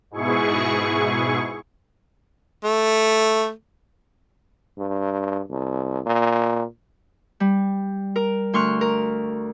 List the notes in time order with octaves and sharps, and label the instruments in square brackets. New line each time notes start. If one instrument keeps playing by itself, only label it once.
[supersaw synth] G#2 B2 E4 G#4 C#6
[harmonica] A3
[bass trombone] G2
C2
A#2
[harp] G3
A#4
D2 C6 C#6 F6 F#6
A#4